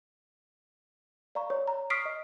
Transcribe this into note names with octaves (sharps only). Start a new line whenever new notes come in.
D5 F5 A#5 C#6
C#5
A#5
C#6 D#6 F6 B6 C7 D7
D#5